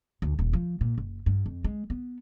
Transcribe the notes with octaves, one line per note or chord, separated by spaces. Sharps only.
D2
D#1
F3
A#2
F#1
G2
F2
G#3
B3